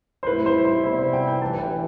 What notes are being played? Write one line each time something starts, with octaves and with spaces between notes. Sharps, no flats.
C5
A2 G3 C4 E4 B4
C5
C5
C3 G3 B3 E4 C5
C5
G5
G5
A1 G2 E3 A5
G5